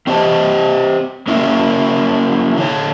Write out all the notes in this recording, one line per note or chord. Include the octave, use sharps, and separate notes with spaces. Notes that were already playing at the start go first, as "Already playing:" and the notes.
C4 G4 C5 D#5 A5
A#3 C#4 E4 A#4
D3 C#5